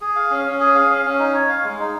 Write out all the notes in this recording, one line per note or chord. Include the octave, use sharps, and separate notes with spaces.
G#4
F5
C#4
C#4
G#4
F5
C#4
C#4
D#4
C#5
F5
G#3
D#4